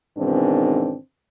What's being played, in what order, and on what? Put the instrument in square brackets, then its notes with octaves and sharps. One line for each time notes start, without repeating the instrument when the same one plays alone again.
[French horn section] G#2 B2 D#3 E3 C4 D4